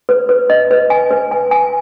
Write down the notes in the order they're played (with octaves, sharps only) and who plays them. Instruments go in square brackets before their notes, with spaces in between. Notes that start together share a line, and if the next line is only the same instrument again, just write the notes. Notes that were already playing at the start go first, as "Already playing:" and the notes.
[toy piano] B4
B4
D#5
B4
G#5
B4
G#5
G#5